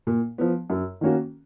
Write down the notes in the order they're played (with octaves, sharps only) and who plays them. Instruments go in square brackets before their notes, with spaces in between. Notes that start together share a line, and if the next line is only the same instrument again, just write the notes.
[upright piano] A#2
F3 B3
F#2
D#3 A#3 C#4 F#4